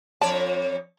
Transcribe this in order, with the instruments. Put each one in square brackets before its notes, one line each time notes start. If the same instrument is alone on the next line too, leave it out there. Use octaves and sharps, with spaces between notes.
[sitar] F2 C#5 D5 [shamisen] A5